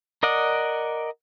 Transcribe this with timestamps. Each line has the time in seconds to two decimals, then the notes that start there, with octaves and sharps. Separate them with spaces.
0.23 A#4 D5 D#5 F#5